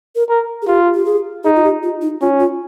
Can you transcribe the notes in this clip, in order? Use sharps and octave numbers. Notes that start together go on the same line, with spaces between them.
A#4
A#4
G#4
F4 G4
G4
G#4
D#4 G#4
F4
G4
F4
D#4
C#4 F4
F4